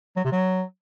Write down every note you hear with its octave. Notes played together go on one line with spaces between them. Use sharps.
F#3
C3
F#3